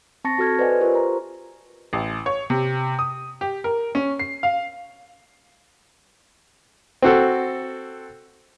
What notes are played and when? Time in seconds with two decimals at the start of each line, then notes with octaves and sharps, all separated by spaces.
0.24 C4 A5 C#6 A6 A#6 C#7
0.38 F#4 A4 F6 G#6
0.59 B4 C5 D5 D#5 F#5 G#5
0.81 F4 G4 A#4 C5 C#6
0.95 A#5
1.93 A1
2.26 C#5
2.50 C3
2.99 D#6
3.41 G4
3.64 A#4
3.95 C#4
4.19 C7
4.43 F5
7.02 C4 F#4 A4